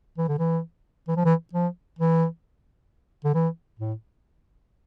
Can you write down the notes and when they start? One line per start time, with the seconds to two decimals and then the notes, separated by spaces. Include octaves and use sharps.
0.18 E3
0.29 D3
0.39 E3
1.09 E3
1.17 F3
1.26 E3
1.54 F3
1.99 E3
3.25 D3
3.35 E3
3.80 A2